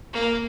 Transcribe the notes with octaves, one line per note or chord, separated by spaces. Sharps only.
A#3